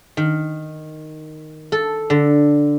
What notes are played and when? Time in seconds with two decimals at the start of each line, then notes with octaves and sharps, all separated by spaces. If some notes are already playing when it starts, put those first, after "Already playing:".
0.17 D#3
1.72 A4
2.10 D3